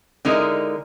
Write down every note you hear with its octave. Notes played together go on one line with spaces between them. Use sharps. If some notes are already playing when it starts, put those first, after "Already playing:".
D3 G#3 D#4 E4 A#4